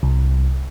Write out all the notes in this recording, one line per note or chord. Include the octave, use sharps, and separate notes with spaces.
C2